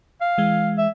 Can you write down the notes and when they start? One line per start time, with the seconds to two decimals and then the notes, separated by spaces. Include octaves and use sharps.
0.21 F5
0.38 E3 G#3
0.78 E5